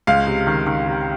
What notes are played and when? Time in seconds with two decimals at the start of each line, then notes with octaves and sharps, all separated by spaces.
0.07 C#2 F5
0.27 C3
0.47 D#3
0.67 D#3
0.86 C3